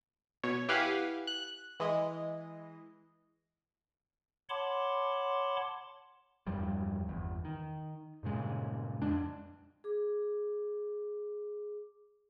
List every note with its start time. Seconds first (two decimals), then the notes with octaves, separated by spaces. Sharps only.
0.44 B2 C#5
0.69 E4 G4 B4 F5 F#5 G#5
1.27 F#6
1.80 E3 G#3 D#5
4.50 C#5 F#5 A5 B5 C6 D6
6.47 E2 G2 F3 G3
7.08 G1 E2
7.45 D#3
8.23 G2 A#2 C#3 G#3
9.02 F2 G#3 D4
9.84 G#4 D6